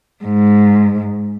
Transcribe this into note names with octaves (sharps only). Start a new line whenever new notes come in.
G#2